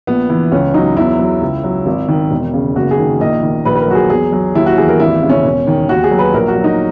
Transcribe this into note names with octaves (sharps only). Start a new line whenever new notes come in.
A#1 B3
E3
C#2 C#4
F#3 D#4
E2 E4
F#3
C#2
F#3
G#1
D#3
E1
C#3
F#1 F#4
G#4
D#3
A#1 D#5
D#3
A#1 B4
B4
A#4
F#3 F#4
G#4
E2 G#4
F#3
D#2 E4
F#4
E3 G#4
A#4
G#1 E4
C#3
C#4
E1
D#3
D#2 F#4
G#4
F#3
B4
A#1 A#4
F#4
F#3
D#4